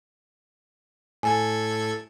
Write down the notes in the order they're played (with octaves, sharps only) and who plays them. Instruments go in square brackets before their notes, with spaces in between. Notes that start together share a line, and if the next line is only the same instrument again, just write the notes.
[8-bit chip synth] A2 A4 G#6 [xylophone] G#5